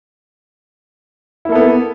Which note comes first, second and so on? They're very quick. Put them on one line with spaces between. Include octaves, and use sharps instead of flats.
E4 A#3 A4 B3